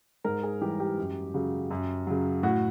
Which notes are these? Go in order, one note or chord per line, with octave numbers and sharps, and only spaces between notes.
G#2 A#4
G#4
E3 G3 G4
G4
F#2
C#3 F#3
F#2
C#3 F#3
A2 F#4